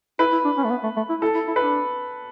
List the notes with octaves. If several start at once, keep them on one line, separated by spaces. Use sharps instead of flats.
E4 B4
E4
D4
C#4
A3
B3
A3
A3
E4
E4 A4
E4
E4
D4 B4